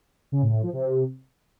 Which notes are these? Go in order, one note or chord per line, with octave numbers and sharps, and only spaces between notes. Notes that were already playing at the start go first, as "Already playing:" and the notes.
C#3
A2
A2
F3
C3